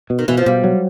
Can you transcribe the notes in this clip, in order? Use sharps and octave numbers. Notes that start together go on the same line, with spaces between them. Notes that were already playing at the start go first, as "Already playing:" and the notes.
B2
D#3
B2 E3
F3
B2 G3
F#3